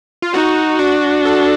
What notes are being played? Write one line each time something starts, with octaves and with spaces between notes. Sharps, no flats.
F4
D#4 F#4
D4 F#4
A4